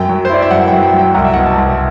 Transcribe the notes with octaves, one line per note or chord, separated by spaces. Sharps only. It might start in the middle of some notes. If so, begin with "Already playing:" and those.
Already playing: F#2 G5
F#3
C5
E4 D5
E5
F#2 F#5
F#3 G5
G5
F#3
G5
C2 F#5
E5
B2 F#5
A5
C2